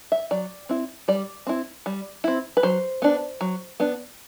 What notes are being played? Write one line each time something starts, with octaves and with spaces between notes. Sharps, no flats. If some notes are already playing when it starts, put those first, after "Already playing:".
E5
F#3 D5
C4 E4
G3 D5
C4 E4
G3
C4 E4
B4
F#3 C5
B3 D4
F#3
B3 D4